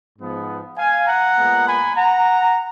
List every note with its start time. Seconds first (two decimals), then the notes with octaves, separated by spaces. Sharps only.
0.19 G#2 F3 B3
0.78 F5 G#5
1.07 F#5 A#5
1.37 A#2 G#3 B3
1.67 G#5 B5
1.96 F#5 A#5